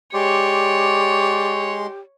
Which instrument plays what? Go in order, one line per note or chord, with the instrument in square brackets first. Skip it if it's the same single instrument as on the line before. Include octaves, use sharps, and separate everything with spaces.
[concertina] G#3 C6 [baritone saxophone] G4 [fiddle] C#5 [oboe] D5